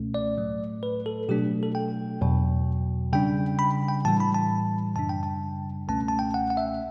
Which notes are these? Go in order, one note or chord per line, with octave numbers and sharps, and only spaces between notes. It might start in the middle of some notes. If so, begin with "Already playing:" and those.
Already playing: C#2 B2 A3 C#4
D5
A2 F#3 A3
B4
A4
B2 F#3 A3 D4 G4
A4
G5
E2 B2 F#3
C#3 G3 D4 G5
B5
G5
A2 E3 G3 A5
B5
A5
F#2 C#3 G3 D4 A5
G5
A5
C#2 B2 A3 C#4 A5
A5
G5
F#5
F#5
E5